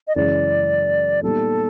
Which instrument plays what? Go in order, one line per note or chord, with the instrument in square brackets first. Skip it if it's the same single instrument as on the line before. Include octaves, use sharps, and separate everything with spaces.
[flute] D#5
[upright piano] F#2 C#3 E3 G#3 C#4 [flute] D5
[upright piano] A#2 G3 B3 D#4 [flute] A4